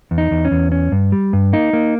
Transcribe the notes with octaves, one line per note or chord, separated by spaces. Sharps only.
E2
D#4
E2
C#4
E2
C#4
G2
G3
G2
A#3 D#4
A#3